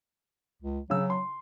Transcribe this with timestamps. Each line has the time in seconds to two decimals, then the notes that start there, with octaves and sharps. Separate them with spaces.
0.62 C#2
0.90 C#3 F#3 E6
1.10 C6